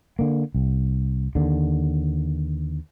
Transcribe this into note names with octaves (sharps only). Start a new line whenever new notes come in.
D3 A#3
C2
D#2 D3